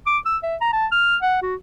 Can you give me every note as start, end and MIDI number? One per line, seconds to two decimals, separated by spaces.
0.07 0.18 86
0.25 0.37 88
0.43 0.56 76
0.61 0.72 82
0.73 0.87 81
0.92 1.16 89
1.22 1.39 78
1.42 1.55 66